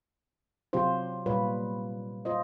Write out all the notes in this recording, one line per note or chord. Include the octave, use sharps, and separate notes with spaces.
C3 F#3 F4 G4 C5
A#2 G3 F4 B4 C#5
F4 C5 D#5